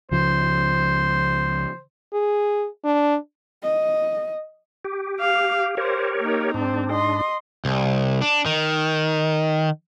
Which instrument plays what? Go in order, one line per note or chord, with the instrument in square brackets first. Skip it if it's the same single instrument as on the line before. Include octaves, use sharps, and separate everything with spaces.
[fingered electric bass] C#2 C#3 F3 [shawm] C5
[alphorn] G#4
D4
[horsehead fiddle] D#5
[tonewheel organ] G4
[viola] F5
[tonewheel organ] G4 A#4 C#5 [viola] C5
[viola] A#3 D#4
[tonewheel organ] G#2 D4 [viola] C4
[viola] D#5 C6
[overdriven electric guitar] C2
D4
D#3